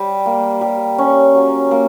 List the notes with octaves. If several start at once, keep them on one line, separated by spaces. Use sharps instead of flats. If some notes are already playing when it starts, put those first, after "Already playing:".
Already playing: G3
A#3
G3
C#4
F#3
A#3